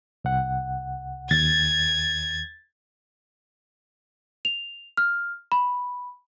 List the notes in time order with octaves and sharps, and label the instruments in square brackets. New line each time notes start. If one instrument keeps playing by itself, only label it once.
[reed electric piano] C2 F#5
[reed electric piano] D#2 [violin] G#6 [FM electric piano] A6
[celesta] F7
F6
B5